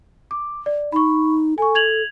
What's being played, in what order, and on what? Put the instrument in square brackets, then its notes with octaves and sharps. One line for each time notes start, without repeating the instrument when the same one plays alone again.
[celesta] D6
D5
[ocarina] D#4 [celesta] B5 C#6
[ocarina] A4 [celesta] G#5 C#6
[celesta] G#6 F7 F#7